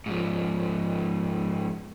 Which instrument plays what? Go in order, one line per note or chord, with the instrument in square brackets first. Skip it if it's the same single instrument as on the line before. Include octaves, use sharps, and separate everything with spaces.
[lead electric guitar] G#2 F3